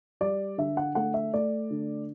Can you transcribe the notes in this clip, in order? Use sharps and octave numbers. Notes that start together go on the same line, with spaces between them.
G3 D5
D3 E5
F#5
A3 F#5
E5
A3 D5
D3